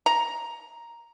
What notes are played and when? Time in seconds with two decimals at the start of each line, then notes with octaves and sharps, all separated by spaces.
0.06 A#5